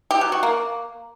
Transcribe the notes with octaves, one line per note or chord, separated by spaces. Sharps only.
G4
F#3
F#4
A#3